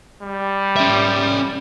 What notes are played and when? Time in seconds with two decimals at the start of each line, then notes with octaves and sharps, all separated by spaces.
0.22 G3
0.76 C#4 E5